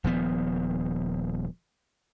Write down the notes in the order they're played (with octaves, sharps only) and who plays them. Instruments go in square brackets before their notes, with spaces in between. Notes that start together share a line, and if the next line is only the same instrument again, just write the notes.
[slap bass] D#1 F3 B3